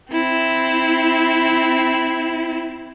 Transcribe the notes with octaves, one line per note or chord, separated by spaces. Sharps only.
C4 E4